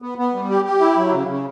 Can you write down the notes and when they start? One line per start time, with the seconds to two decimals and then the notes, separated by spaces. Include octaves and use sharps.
0.02 B3
0.18 B3
0.34 G3
0.50 G4
0.65 G4
0.80 E4
0.97 F#3
1.12 C#3
1.28 C#3